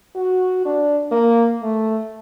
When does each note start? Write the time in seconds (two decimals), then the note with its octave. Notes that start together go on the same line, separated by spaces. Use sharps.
0.16 F#4
0.66 D4
1.11 A#3
1.63 A3